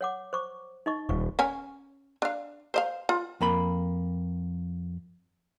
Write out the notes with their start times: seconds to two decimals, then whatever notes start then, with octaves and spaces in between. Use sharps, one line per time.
0.01 C#5 F#5 D6
0.33 C5 C#6 D6
0.86 D#4 D#5 C#6
1.09 D#1 C#6
1.39 C#4 C#5 G#5
2.22 D4 F5
2.74 C5 D#5 F5
3.09 F4
3.41 F2 A#3 B5